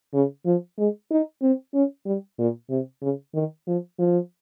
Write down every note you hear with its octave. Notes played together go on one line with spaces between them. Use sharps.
C#3
F3
G#3
D#4
C4
C#4
G3
A#2
C3
C#3
D#3
F3
F3